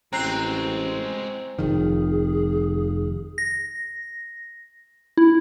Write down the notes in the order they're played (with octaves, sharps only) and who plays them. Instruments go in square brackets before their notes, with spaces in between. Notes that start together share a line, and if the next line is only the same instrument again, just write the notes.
[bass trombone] A1 [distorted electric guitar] G#3 F#4 [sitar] C4 [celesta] A#5 F#6 C7
[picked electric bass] F1 F2 D#3 [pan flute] G#4
[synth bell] A#6
E4